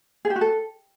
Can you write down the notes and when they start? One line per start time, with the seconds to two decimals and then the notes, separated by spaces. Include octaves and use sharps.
0.25 G#4
0.30 G4
0.36 F#4
0.41 A4